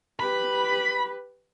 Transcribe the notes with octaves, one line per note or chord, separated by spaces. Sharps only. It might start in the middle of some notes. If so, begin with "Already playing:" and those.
G4 B4 B5